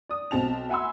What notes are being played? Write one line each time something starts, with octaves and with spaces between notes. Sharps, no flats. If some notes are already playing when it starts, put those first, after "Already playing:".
D5 D#6
B1 C4 A5 F7
E5 F#5 G#5 B5 C6 E6